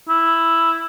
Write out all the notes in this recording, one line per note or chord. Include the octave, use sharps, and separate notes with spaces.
E4